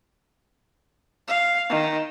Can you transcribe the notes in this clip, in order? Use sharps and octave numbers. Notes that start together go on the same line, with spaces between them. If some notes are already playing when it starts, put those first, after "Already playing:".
F5
D#3